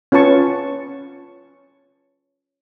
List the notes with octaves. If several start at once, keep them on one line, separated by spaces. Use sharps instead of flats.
C#4 F4 B4 A5 C#6